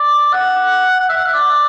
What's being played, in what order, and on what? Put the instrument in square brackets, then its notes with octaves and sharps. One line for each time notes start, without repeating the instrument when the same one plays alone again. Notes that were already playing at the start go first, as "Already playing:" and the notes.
Already playing: [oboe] D5
F#5
F#5
E5
F#5
E5
D5